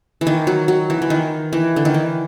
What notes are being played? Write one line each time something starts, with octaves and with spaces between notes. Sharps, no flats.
E3
D#3
F#3
F#3
E3
E3
D#3
E3
D3
D#3
E3